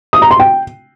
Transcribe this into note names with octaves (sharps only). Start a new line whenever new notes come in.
D#6
A#5
C6
G5